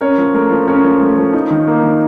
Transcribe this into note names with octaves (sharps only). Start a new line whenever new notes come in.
C#4 A#4 C#5
F3
A3 A#4
F3
C#4 A#4 C#5
F3
A3
F3
D#4
D#3
A#3
D#3